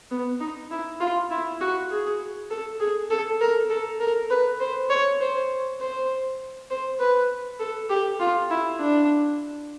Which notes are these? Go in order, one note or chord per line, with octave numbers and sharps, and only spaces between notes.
B3
D#4
E4
F4
E4
F#4
G#4
A4
G#4
A4
A#4
A4
A#4
B4
C5
C#5
C5
C5
C5
B4
A4
G4
F4
E4
D4